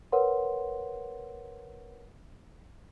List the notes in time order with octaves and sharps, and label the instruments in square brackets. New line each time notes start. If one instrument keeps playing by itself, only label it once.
[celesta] A#4 B4 C#5 F#5 C6